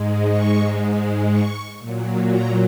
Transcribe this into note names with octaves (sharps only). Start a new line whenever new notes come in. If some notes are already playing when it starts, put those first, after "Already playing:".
Already playing: G#2 G#3
C#6
C#6
A#2 F#3
A#5